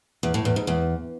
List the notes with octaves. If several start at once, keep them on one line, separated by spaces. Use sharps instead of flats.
E2
A2
E2
G#2
E2